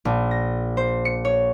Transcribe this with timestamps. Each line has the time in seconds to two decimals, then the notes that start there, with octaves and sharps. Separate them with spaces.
0.05 A#1
0.31 A#6
0.77 C5
1.05 C#7
1.25 C#5